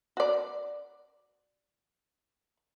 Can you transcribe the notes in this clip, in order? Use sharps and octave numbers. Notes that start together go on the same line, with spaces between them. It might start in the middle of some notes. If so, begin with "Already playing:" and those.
F#4 D5